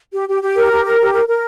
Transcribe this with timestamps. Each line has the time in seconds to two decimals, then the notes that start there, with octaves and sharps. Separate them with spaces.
0.13 G4
0.28 G4
0.42 G4
0.57 A#4
0.71 G4
0.85 A#4
0.99 G4
1.13 A#4
1.27 A#4